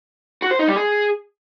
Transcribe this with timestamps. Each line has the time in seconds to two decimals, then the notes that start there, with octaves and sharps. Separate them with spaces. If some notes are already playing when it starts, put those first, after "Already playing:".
0.42 F#4
0.51 C5
0.59 D#4
0.68 G3
0.76 G#4